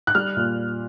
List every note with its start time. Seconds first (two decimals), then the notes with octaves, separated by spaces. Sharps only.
0.07 F#6
0.15 G3 F6
0.37 A#2